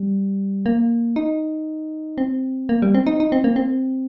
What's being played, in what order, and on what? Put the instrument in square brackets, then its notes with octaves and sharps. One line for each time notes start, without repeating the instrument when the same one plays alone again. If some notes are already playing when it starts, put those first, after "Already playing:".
Already playing: [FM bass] G3
A#3
D#4
C4
A#3
G3
C4
D#4
D#4
C4
A#3
C4